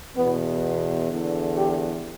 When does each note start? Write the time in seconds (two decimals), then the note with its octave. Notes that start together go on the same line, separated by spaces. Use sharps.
0.16 E2 B2 B3
1.09 E2 D3
1.56 G4